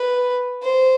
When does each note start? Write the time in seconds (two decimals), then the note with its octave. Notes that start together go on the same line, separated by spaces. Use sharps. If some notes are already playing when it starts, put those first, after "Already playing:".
Already playing: B4
0.62 C5